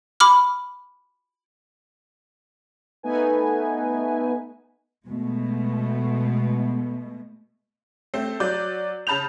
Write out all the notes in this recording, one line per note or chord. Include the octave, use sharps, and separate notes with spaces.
B5 D6 F6
A3 B3 D#4 B4 G#5
B2 G#3 A3
A3 C4
F#3 D5 G6
C#3 A5 B5 G6 F7